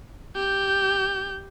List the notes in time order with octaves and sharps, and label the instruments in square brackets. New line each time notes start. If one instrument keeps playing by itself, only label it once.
[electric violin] G4 G6